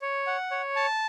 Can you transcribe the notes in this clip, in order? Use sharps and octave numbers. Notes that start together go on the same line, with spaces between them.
C#5
F#5
C#5
A5